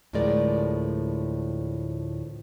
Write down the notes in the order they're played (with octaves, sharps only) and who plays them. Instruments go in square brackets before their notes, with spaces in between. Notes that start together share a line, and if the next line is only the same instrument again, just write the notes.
[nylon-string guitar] D2 A2 F3 G#3 A#4 D5